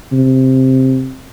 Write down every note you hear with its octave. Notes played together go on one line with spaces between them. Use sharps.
C3